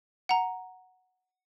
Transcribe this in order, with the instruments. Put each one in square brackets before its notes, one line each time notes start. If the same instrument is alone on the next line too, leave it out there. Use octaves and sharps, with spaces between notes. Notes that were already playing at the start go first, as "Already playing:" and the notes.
[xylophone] F#5 A#5